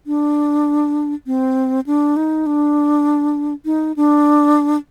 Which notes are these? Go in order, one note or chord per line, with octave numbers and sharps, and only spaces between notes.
D4
C4
D4
D#4
D4
D#4
D4